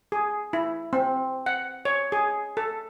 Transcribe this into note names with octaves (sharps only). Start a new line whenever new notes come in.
G#4
E4
C4
F#5
C#5
G#4
A4